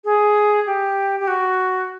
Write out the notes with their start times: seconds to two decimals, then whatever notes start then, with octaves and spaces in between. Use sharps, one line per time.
0.05 G#4
0.66 G4
1.20 G4
1.28 F#4